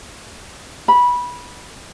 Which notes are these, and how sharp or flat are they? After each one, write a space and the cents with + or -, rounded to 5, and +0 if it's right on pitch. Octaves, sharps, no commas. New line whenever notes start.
B5 -15